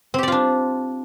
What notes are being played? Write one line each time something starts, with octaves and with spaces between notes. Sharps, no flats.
C4 D4 F4 G4 D5